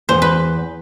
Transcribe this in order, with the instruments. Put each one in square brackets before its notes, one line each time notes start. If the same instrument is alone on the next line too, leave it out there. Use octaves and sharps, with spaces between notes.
[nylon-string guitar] E2 [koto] C5
[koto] B4